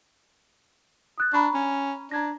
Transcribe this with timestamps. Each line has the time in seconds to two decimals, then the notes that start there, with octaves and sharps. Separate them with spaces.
1.18 D#6 F#6 A6
1.33 D4 A#5 B5 C#6
1.54 C#4
2.11 D4 A#5 G#6 A#6